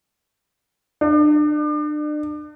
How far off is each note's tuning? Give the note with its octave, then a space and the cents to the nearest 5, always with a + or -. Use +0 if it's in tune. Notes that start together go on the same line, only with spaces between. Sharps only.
D4 +35